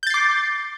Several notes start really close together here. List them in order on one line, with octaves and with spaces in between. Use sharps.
G6 A6 C7 D6